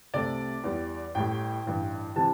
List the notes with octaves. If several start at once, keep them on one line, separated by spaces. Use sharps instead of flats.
C2 C3 A3 D5
E2 E3 G3
A1 A2 G3 G5
A1 G2 E3
C3 E3 G3 A5